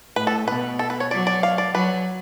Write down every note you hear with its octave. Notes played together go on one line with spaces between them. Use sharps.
A2 B4
A4
B2 B4
A4
B4
C#5
F#3 D5
D5
F5
D5
F#3 B4